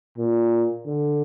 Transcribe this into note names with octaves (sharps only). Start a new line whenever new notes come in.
A#2
D3